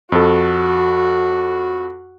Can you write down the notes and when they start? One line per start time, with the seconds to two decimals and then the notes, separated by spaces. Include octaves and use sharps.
0.12 F2 F#4 A4